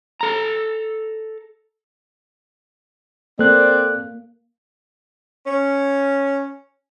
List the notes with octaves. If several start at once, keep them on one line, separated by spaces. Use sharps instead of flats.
A4 A#5
A#3 C4 A4 D5 F#6
C#4